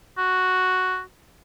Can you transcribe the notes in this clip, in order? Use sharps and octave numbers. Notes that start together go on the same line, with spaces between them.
F#4